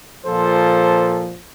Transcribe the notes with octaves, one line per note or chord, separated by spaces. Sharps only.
A#2 F3 A4 C5